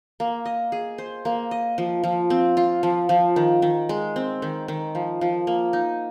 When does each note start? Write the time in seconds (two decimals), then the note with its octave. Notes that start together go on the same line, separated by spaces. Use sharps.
0.20 A#3
0.45 D#5
0.72 G#4
0.98 C5
1.25 A#3
1.51 D#5
1.78 F3
2.04 F3
2.30 C4
2.57 F4
2.83 F3
3.09 F3
3.36 D#3
3.62 D#3
3.89 G#3
4.16 C4
4.42 D#3
4.68 D#3
4.95 F3
5.21 F3
5.47 A#3
5.73 D#4